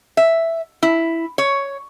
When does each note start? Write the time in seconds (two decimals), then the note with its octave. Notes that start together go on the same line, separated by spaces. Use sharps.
0.17 E5
0.83 E4
1.38 C#5